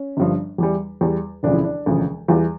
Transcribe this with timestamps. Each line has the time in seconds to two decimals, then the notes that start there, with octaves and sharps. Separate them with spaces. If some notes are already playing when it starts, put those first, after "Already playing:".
Already playing: C#4
0.17 G1 G2 F3
0.58 E2 E3 G3
1.01 E2 E3 G3
1.43 E1 D2 C#3 F3 D4
1.54 E4
1.64 D4
1.86 E1 D2 C#3 F3
2.28 E2 E3 G3 F4